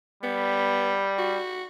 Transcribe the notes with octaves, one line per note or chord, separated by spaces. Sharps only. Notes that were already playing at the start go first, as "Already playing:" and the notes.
G3 B3
F#4